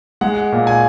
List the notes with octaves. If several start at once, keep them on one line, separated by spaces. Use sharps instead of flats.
G#3 F#5
A#2
G#5